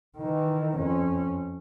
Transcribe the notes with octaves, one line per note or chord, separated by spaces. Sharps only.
D#3 E3
F2 C#4